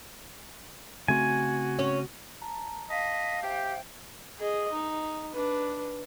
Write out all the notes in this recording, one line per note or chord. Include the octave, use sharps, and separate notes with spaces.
C#3 A3 C4 F#4 G#5
C#4 C#5
A5 A#5
D#5 F5 A5 B6
G4 C5 E5 G5
G#4 D#5
D#4
D4 B4